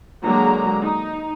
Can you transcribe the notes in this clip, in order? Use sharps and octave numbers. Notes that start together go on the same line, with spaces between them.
D3 F#3 G#3 A#3 A#5
D#4